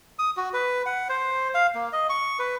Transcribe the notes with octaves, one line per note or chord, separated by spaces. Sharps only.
D#6
F#4
B4
F#5
C5
F5
A#3
D#5
C#6
B4